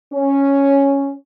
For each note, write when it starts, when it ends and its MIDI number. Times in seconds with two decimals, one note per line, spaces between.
0.13 1.13 61